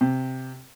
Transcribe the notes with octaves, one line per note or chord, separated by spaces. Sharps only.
C3